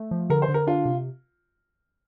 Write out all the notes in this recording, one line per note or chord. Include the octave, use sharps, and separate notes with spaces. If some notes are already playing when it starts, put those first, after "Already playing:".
Already playing: A3
F3
D3 A#4
C5
D3
A#4
D4 F4
C3